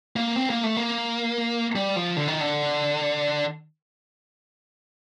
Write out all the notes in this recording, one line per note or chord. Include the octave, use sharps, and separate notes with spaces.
A#3
C4
A#3
A3
A#3
G3
F3
D3
D#3
D3